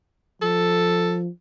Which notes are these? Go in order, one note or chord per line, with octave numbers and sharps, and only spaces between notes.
F3 A4